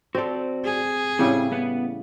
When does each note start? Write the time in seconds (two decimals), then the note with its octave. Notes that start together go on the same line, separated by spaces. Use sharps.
0.15 C4 F#4 A4 D5
0.65 G#4
1.19 A2 C#3 G3 C4 E4
1.52 B3 B4 F#5